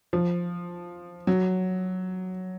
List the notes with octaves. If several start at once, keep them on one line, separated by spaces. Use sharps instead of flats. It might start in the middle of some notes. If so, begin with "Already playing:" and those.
F3
F#3